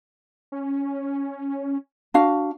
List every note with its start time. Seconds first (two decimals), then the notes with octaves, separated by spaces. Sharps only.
0.52 C#4
2.14 D4 F#4 F5